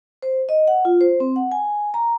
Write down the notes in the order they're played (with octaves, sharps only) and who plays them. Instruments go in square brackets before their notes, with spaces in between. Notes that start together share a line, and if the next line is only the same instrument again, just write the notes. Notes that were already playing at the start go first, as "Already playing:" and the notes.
[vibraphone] C5
D#5
F#5
F4
C5
C4
F#5
G#5
A#5